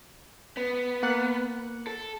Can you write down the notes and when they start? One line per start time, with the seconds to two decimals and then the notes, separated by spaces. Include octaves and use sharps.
0.57 B3
1.03 A#3 F#5 F#6
1.87 A4